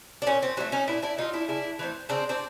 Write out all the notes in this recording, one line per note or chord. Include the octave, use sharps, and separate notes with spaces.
D4
A#2 C#4
C4
F#3 A3 C#4
C#4 D#4
A#2 D4 E4
D4 E4
F#3 A3 D#4 F4
D4 E4
C#3 D4 E4
E3 A3 C4
C#3 C4 D4
C4 D4